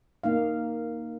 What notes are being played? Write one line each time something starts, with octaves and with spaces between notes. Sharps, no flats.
A#3 D#4 F5